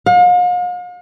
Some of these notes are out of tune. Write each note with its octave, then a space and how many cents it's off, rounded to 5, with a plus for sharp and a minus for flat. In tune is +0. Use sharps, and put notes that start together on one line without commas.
F5 +45